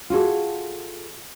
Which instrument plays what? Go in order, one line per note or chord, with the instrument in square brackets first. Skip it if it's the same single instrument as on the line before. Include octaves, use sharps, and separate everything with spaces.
[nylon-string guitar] F4 F#4 G#4 A4